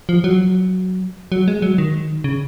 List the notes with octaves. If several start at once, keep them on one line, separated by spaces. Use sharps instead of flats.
F3
F#3
F#3
G#3
F#3
D#3
C#3